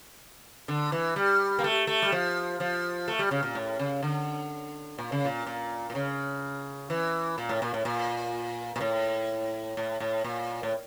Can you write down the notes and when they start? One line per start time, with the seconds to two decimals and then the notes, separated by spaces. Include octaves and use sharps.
0.68 D3
0.92 E3
1.16 G3
1.59 A#3
1.64 A3
1.87 A3
2.02 G3
2.12 F3
2.60 F3
3.08 A3
3.19 G3
3.31 C#3
3.43 A#2
3.55 A2
3.79 C#3
4.03 D3
4.99 A#2
5.12 C#3
5.25 A#2
5.47 A#2
5.90 A#2
5.95 C#3
6.90 E3
7.38 A#2
7.49 A2
7.62 A#2
7.74 A2
7.85 A#2
8.76 A#2
8.81 A2
9.77 A2
10.00 A2
10.24 A#2
10.63 A2